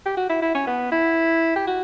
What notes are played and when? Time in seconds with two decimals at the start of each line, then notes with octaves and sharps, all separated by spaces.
0.06 G4
0.17 F#4
0.30 E4
0.42 E4
0.55 C#4
0.67 B3
0.92 E4
1.56 G4
1.67 F#4